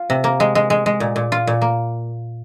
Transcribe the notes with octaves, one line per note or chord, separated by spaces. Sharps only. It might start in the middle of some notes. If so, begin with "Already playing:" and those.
Already playing: F4
C3
A#3
G#3
G#3
G#3
G#3
A#2
A#2
F4
A#2
A#3